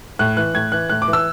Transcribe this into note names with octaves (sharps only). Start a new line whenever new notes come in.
A2 F#6
E3 F#6
A2 G#6
E3 F#6
A2 F#6
D6
E3
E6